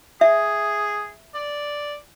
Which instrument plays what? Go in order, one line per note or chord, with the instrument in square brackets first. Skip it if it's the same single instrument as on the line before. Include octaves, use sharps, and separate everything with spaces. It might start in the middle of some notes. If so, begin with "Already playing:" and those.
[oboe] G#4 [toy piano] E5
[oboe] D5